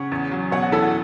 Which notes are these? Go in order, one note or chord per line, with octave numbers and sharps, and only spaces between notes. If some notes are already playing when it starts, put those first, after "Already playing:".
Already playing: C#3 C#5 F#5
E2
F#3
B2 C#5 F#5
F#4
E2 E4 A4
F#4